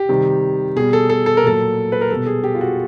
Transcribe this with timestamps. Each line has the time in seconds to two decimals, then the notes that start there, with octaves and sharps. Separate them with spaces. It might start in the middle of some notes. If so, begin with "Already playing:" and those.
Already playing: G4
0.09 C3 D#3 G3
0.76 B2 G3 G#4
0.93 A4
1.10 A4
1.26 A4
1.37 A#4
1.43 A#2 F#3 A4
1.92 B4
2.01 A#4
2.10 B2 G3 A4
2.27 G#4
2.44 G4
2.55 F4
2.61 F#4